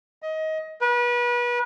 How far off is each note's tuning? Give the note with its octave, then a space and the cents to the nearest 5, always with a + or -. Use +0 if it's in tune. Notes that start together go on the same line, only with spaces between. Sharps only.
D#5 +20
B4 -30